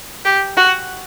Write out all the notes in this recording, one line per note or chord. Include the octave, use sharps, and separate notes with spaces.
G4
F#4